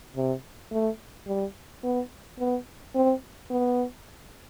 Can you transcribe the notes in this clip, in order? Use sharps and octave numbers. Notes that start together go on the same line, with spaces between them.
C3
A3
G3
B3
B3
C4
B3